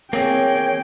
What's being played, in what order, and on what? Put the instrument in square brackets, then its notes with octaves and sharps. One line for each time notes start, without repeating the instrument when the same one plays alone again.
[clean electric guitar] A#3 G#4 [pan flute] C4 [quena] C#5 [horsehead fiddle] G5